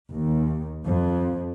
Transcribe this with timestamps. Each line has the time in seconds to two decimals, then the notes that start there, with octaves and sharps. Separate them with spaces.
0.10 D#2
0.83 F2